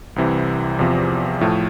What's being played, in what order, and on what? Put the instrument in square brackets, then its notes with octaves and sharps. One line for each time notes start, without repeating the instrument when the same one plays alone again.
[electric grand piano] C2 C3 E3
E2 C3 F3
A2 F3 A3